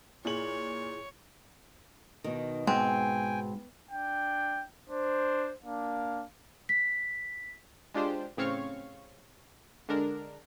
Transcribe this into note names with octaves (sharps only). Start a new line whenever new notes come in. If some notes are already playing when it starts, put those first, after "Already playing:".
A#2 E4 G#4 C#5 F#7
B2 D#3
G#2 B2 C4 G5 G#5
D4 G5
D4 C5
A#3 D4 F5
B6
G#3 D4 F4 G4 C5
A1 C#3 C4 C#5 F5 C#6
D3 G#3 D4 A#4